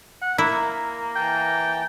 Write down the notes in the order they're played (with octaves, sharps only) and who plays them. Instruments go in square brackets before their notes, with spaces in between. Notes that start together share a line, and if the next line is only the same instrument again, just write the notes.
[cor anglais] F#5
[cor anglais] A#3 [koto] E4 [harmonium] A#4
[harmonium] E3 A5 A#5 [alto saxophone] G5